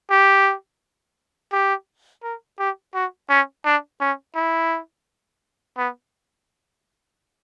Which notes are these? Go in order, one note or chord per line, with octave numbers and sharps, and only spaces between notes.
G4
G4
A#4
G4
F#4
C#4
D4
C#4
E4
B3